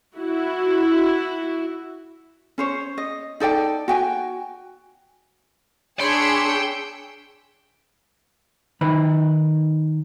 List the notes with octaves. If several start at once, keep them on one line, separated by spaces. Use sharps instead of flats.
E4 F#4
C#4 C5 C#5
D#5
D#4 A4 D5 G5
F#4 G5 G#5
D4 G#4 C#5 G5 B5 C6 E6 C#7
D#3 D#4 B4 B5